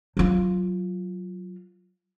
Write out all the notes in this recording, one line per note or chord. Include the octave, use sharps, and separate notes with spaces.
F#3 F4